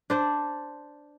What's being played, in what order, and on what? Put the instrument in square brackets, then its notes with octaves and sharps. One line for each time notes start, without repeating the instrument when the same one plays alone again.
[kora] D4 C5 D5